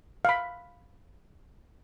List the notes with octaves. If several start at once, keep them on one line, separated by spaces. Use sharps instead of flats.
F5 B5